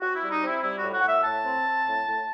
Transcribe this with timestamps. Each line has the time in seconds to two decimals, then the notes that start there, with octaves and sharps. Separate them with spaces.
0.01 C4 F#4
0.15 E4
0.22 G3
0.31 D#4
0.42 C4 E4
0.62 G3 E4
0.78 A2 F#4
0.93 F#4
1.02 A2 F#5
1.08 E5
1.23 A2 A5
1.45 C4
1.66 C4
1.86 A2
2.06 A2